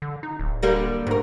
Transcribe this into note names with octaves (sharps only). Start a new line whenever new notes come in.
D3
D#4
D1
D3 G3 A#3
D2 G#2 A#4